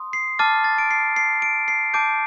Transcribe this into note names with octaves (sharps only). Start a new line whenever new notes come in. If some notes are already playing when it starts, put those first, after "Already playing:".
Already playing: C6 D#6
C7
A5 D6 F6 A6
A6
D7
C7
C7
D7
C7
A5 D6 G6 D7